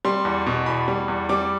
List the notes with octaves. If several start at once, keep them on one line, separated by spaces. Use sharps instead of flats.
G3 C6
E2
B2
E2 B5
G3
E2
G3 D6